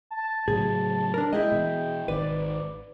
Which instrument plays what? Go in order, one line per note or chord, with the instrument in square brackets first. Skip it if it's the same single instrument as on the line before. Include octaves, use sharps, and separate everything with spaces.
[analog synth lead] A5
[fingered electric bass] A2 C#3 F#3 [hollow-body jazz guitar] G#4
[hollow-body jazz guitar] D4 A#4
[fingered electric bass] G#3 [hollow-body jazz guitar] E4 G#4 D#5 [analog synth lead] G5
[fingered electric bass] B2 E3
[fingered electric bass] G#1 D#3 [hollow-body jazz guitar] B4 [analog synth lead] D5